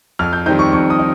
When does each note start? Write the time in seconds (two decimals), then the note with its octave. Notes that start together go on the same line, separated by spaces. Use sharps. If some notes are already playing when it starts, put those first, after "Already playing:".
0.19 F2 F6
0.33 G6
0.46 D#3 G3 C4 D#4 G6
0.59 C#6
0.72 F2 C#6
0.90 D#6
0.99 D#4